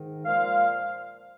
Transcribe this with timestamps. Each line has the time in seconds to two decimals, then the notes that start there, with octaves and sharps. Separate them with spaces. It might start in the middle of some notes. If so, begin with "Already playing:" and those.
Already playing: G#2 D#3
0.25 A#2 F3 G#3 F5